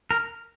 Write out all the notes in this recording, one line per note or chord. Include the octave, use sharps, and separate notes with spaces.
A#4